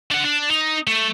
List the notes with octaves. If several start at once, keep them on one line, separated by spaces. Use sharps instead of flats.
D4 F#5
D4
D#4
A3